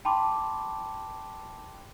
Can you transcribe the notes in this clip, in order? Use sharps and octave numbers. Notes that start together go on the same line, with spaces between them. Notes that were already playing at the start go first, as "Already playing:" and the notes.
G5 A5 B5 C6 D6